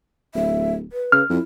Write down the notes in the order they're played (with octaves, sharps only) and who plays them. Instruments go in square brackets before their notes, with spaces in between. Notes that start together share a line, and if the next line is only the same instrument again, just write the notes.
[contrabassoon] D1 [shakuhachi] E5
[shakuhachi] B4
[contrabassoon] C#3 [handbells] F6
[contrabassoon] F2 [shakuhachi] E4